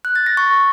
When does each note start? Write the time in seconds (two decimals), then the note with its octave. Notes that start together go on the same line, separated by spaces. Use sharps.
0.05 F#6
0.16 A6
0.26 A#6
0.37 C#6